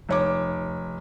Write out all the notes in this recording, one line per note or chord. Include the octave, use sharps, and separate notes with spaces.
F1 C#5 D6